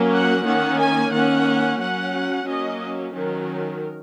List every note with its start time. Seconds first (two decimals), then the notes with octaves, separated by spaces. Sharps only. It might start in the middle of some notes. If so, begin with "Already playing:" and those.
Already playing: F#3 A#3 C#4
0.12 F#5
0.45 D#3 A#3 C#4 F#5
0.79 G#5
1.13 D#3 A#3 C#4 F#5
1.80 F#3 C#4 F#5
2.47 F#3 A#3 C#4 D#5
3.15 D#3 F#3 C#4 A#4